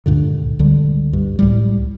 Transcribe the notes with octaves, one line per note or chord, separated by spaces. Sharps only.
C#2 G2 A#2 D3
C#2 D3 G3
G2
C#2 A2 G3